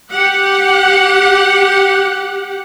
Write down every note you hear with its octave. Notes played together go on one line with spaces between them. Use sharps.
G4 F#5